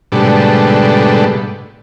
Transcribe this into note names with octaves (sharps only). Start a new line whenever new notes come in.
G#2 B2 D3 G3 A3